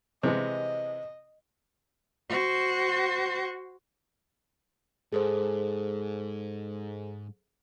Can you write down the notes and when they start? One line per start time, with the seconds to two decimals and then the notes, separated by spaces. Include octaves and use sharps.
0.23 C3 E3 G#3 D#5
2.29 F#4 C5
5.12 G#2 G#4 A4 C5